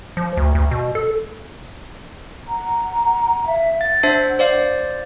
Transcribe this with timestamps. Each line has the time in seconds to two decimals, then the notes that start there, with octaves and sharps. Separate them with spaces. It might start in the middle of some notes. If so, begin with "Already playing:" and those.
0.17 F3
0.37 D2
0.55 D2
0.71 B2
0.95 A4
2.48 F#5 A#5
3.47 E5 F5
3.81 F#5 A6
4.03 D4 C5 E5
4.39 C5 D5 F5